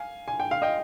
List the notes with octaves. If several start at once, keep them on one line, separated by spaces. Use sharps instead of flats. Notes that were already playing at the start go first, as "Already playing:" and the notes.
Already playing: F5 G#5
G#5
G5
F5
D#5 G5